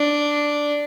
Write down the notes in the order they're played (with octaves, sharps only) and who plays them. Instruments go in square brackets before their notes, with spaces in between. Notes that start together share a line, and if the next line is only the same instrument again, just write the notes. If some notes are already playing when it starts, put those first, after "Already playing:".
Already playing: [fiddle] D4